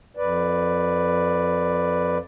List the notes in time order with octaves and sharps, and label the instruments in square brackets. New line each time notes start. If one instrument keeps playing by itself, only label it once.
[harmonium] F2 B4 D5